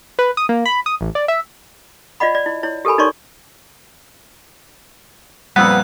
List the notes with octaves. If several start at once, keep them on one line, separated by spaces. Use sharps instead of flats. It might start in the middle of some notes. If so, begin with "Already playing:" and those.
B4
D#6
A#3
B5
D#6
A1
D5
E5
F4 D5 D#5 F#5 B5
D5
E4
E4 C#5
G4 A4 A#4 G#5 B5
D#4 A#4 C#5 D5 C6 C#6
F2 A#2 G3 B3 E6 F#6